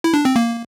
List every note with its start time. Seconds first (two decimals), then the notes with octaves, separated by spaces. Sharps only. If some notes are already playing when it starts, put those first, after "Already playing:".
0.04 E4
0.14 D4
0.25 C4
0.36 A#3